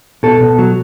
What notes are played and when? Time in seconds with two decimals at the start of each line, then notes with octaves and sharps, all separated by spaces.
0.23 B2 A4
0.40 B2
0.59 F#3